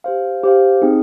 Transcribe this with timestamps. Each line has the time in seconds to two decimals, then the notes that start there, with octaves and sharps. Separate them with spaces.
0.04 G4 C5 F5
0.43 G4 C5 F5
0.82 C4 D#4 G#4